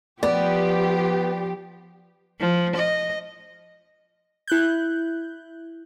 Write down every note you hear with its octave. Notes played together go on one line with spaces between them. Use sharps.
F3 B3 G4 D5
F3
D#5
E4 F#6 G6